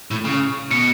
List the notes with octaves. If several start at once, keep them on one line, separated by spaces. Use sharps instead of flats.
A2
C#3
B2 C#7